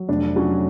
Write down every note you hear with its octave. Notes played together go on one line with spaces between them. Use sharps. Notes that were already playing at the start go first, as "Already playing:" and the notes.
Already playing: F#3
F1 D4
F#3 C#4